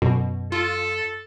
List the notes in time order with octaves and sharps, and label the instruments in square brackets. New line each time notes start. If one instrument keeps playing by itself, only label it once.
[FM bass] F#2 [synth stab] B2
[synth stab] F4 [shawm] A4